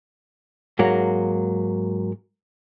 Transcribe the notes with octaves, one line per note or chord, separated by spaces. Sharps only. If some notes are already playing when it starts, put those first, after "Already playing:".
G#2 F#3 A#3